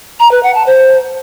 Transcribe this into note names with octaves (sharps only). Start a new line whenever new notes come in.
A#5
B4
F#5
A5
C5